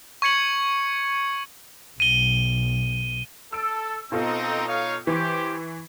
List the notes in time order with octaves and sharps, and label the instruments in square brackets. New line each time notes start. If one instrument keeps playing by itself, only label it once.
[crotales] C#6 G#6 C#7 F#7
[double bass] B1 [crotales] D#7 G7
[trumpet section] A4 [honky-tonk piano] E6 D7
[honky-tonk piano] B2 F4 A4 [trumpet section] C4 D#4
[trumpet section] D#4 C#5 F5
[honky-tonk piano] E3 C#6 [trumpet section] G4 C5